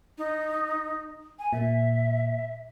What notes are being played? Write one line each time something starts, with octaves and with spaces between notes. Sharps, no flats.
D#4
G#5
A#2 E5